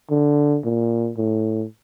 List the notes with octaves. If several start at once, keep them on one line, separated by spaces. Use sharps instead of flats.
D3
A#2
A2